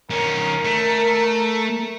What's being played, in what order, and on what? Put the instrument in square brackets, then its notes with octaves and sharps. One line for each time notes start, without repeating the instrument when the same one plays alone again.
[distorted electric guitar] D#3 C#4 [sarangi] A#4
[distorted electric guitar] A3